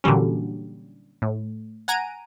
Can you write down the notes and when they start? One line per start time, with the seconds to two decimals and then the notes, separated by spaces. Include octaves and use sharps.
0.04 A#2 D3 E3 F#3 G3 C#4
1.22 A2
1.88 F#5 G#5 A#5 D7 D#7